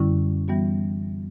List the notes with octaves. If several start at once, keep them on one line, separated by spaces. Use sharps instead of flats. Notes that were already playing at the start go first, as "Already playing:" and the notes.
Already playing: F#2 D3 G3 C#4 E4
E3 G3 B3 F#4